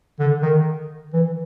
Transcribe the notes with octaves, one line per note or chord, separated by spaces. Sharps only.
D3
D#3
E3